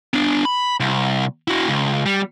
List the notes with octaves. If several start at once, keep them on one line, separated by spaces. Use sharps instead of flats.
B3 D4
B5
C2
E4 F#4
C#2
G3